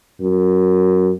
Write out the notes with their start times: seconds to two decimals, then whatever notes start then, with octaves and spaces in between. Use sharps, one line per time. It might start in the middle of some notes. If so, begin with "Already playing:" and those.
0.20 F#2